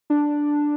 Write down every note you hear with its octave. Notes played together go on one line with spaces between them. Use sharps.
D4